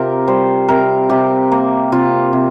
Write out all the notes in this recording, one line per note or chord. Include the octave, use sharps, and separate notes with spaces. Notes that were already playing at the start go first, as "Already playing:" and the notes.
Already playing: C3 F4 G4 A#4
G3 C5
C3 A#4
C3 G4
A#3
C3 F4
C3